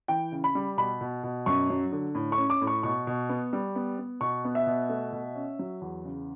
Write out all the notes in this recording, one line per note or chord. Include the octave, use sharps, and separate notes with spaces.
E3 G5
C#3
B5
G3
B2 B5
B2
B2
F#2 C#6
F#3
D3
A2
C#6
C#4
D6
A2
C#6
B2 C#6
B2
B3
G3
B3
B3
B2 C#6
B3
E5
B2
A3
B2
C#4
F#3
E2
C#3